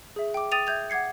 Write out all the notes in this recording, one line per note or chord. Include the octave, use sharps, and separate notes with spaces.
G#4 E5
G5 D6
G5 D#6 A6 D#7 F7
E5 G5 G6 G#6 F7
F#5 D6 G#6 C7 C#7